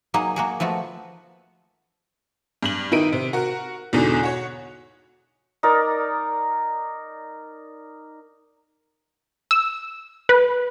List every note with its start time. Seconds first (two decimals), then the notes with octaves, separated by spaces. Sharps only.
0.14 F#3 A#3 D#4 G#4 D#5
0.36 A#3 F#4 G#4
0.60 F3 A3 B3 F#4
2.63 G2 F#7
2.92 D#3 D#4 E4 B4 D7 D#7
3.12 C3
3.33 F#4 A#4
3.93 E2 G#2 B2 D3
4.23 F#4 C#5
5.63 D#4 A#4 D5
9.51 E6
10.29 B4